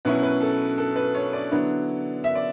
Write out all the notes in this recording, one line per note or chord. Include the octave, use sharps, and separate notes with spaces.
B2 F#3 C#4 E4 B4
B4
A4
A4
B4
C#5
D5
D3 F#3 B3 E4
E5
D5